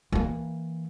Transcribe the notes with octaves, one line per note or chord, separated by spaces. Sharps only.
E3 A#3